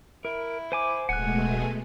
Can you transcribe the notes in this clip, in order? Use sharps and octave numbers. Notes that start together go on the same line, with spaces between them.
E4 A#4
C5 G#5 D6
D1 B2 G#3 A3 F#5 G#5 F#6